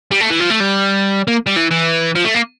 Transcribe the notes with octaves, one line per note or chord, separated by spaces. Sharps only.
G3
A3
E3
F3
A3
G3
A#3
G3
E3
E3
F3
A3
A#3